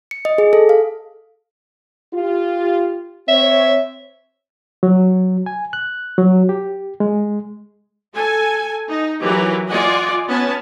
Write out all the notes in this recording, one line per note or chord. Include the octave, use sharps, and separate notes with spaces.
C#7
D#5
G#4
A4
F5
F4 G4
C4 C#5 E5
F#3
G#5
F#6
F#3
G4
G#3
A4 G#5
D#4
E3 F#3 G4 A#4 B4
F4 D5 D#5 F#5 G#5
B3 C#4 G#5 A5